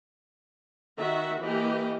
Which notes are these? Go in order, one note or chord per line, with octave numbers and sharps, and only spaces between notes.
D#3 F#4 E5
E3 A#3 G4 D#5